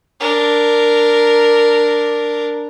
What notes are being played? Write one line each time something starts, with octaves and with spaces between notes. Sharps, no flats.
D4 A#4